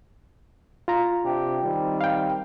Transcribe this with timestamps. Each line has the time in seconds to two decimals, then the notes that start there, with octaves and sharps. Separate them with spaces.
0.88 F4 A#5
1.24 C3 D4 G4
1.63 D#3 G3 C4
2.01 F5 G5